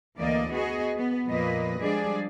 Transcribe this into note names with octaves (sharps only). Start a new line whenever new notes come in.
D2 E3 A#3 D5 D#5
B3 F#4 G#4 D#5
B3
F2 A#2 F3 A#3 B4 D#5
F3 G3 G#3 D4 G#4 D5